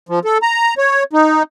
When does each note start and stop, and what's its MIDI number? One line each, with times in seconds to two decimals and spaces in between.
0.09 0.19 53
0.25 0.38 69
0.42 0.74 82
0.78 1.03 73
1.13 1.43 63